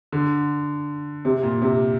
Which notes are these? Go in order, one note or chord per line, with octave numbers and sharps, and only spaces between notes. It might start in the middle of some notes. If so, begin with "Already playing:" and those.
D3
C3
A#2
C3